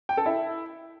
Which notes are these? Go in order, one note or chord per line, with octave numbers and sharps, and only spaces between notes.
G5
A4
E4